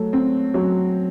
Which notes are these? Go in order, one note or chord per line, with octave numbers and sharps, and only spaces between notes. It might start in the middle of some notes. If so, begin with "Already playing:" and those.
Already playing: F#3 A3
C4
F#3